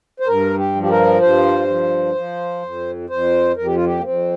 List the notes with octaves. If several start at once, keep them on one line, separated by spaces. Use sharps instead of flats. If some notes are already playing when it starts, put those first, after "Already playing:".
C5
G2 A#4
G4
F3
G4
A#4
G2 C5
F3
F3
F2
F2 C5
F2 A#4
G4
F4
G4
A#3
F2 C4